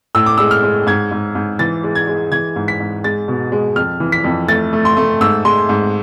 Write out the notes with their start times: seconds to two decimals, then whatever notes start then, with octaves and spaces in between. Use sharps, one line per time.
0.15 A2 E6
0.26 D6
0.38 G#3 E6
0.51 F6
0.63 G#3
0.87 G#2 G#6
1.12 G#2
1.35 G#2
1.59 E3 A6
1.84 G#3
1.95 G#6
2.08 G#3
2.31 E3 G#6
2.56 G#2
2.68 B6
2.80 G#2
3.04 G#3 A6
3.28 B2
3.52 G#3
3.76 F2 F6
4.00 E3
4.12 B6
4.24 F2
4.48 A3 A6
4.73 A3
4.85 C6
4.97 A3
5.21 G#2 E6
5.45 G#3 C6
5.69 G#2